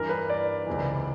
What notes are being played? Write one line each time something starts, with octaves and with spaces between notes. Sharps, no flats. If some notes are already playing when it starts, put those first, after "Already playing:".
Already playing: G2 E3 A#4
B4
D5
C#2 C3 E3